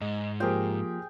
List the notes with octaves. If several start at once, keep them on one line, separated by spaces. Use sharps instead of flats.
G#2 D#5
F3 A#3 F4 G4 G#4 A#4 C5 G5